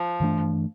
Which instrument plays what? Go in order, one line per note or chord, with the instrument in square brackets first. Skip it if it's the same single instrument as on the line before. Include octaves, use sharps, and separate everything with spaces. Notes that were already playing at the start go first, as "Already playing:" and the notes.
Already playing: [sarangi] F3
[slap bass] G2 E3 A3 D4